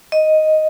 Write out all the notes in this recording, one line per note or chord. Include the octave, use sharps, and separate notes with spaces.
D#5